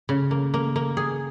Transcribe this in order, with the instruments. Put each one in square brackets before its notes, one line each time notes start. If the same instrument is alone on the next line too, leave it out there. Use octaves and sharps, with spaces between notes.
[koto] C#3
A#3
A#3
A#3
G#4